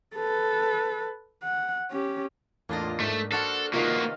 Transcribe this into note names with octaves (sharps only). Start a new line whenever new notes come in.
A4 B4
F#5
C#4 G4
E2 A2 A#3 D4 F4 D#5
G#2 A3 A4
D4 F#4 A4 C5 F6
C3 D#3 A#3 F4 F#4 B4 D#5 F5